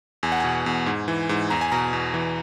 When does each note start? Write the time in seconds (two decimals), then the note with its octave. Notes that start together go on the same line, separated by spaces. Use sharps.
0.23 E2 G#5
0.32 F#5
0.40 B2 G#5
0.66 E2
0.86 G#2
1.08 E3
1.29 G#2
1.50 E2 A#5
1.61 G#5
1.72 B2 A#5
1.93 E2
2.14 E3